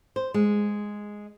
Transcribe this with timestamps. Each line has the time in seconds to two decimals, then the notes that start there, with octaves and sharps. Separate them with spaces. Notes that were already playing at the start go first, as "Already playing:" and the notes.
0.16 C5
0.34 G#3